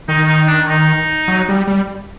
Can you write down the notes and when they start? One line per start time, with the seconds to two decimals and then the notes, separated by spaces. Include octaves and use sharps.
0.08 D#3 D#4
0.28 D#4
0.48 D4
0.68 D#4
1.28 F#3
1.49 G3
1.67 G3